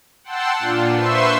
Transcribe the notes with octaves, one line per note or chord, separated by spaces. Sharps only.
F#5 G5 A5 C6 E6
A#2 D4 F4
B4 C5 E5 C6 C#6 E6